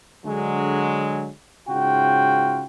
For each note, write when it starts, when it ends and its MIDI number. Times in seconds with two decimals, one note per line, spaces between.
0.26 1.29 50
0.26 1.29 54
0.26 1.29 56
1.68 2.65 44
1.68 2.65 49
1.68 2.65 65
1.68 2.65 66
1.68 2.65 79